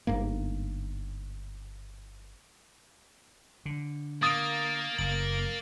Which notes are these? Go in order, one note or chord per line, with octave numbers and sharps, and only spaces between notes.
G1 G#2 A#3
D3
A#3 D#6 A6 D7
F#1 F#7